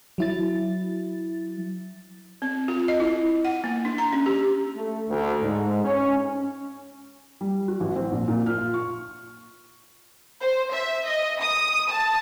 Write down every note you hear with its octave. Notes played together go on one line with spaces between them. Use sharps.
F#3 E4 A6
C4
F4
D#5
E4
F#5
A#3
D4
A#5
C#4
G4
A3
D2
G#2
C#4
G3
F#4
A1
C4
A#1
A#2
F6
F4
C#6
C5
E5
D#5
D#6
A5